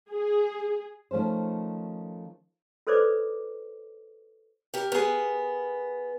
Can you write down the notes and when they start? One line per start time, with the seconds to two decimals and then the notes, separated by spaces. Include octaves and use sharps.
0.11 G#4
1.11 D#3 F3 A3 C#4 C5
2.87 F#4 A4 B4 C5 D5 D6
4.74 G4 A#4
4.92 B3 G#4 A#4